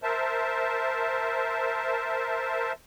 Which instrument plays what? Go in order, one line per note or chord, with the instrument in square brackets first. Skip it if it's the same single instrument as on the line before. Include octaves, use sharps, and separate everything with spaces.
[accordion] A#4 C5 E5 A5